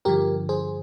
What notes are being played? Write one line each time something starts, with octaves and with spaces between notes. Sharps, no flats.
G2 D3 F3 G4 A#4
G#4 C5